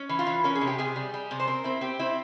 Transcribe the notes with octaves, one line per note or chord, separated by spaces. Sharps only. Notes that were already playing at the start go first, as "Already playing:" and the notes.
Already playing: C#4
E3
F4
E3
C#4 A#4
G#4
C3
G4
C3 G#4
G3
G3
C3
C5
C4 A#4
C4 E4
C4 G4
C4 E4